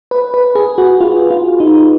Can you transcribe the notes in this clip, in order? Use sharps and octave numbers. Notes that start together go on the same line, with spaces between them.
B4
B4
G#4
F#4
F4
F4
D#4